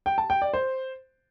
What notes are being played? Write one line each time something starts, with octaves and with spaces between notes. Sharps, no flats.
G5
A5
G5
D5
C5